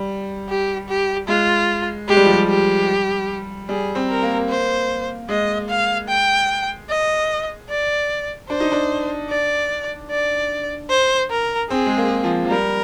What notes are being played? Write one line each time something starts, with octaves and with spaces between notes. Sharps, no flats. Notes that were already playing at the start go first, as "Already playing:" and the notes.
Already playing: G3
G4
G4
G#3 F4
G#3 G4
G3
F3
G3
G4
G3 G#4
C4
A#4
A#3
C5
G#3 D#5
F5
G5
D#5
D5
D4 C5
D#4
D4
D5
D5
C5
A#4
C4 G#4
G#3
A#3
F3
F3
G3 A#4